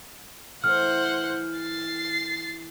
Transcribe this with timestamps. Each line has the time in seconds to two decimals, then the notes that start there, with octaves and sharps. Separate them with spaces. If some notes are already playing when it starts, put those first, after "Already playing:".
0.64 E3 A3 C5 F#5 F6
1.57 A6 C7